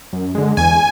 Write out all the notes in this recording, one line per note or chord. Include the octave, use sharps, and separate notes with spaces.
F#2
D3 G#3
E2 G#5